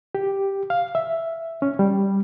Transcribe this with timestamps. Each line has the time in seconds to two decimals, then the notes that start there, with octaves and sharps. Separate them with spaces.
0.15 G4
0.70 F5
0.95 E5
1.62 C#4
1.79 G3